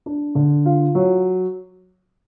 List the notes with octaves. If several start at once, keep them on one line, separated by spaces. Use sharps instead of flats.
D4
D3
F4
F#3